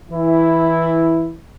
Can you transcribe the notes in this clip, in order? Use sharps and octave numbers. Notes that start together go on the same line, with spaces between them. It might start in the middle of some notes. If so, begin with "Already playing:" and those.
E3 E4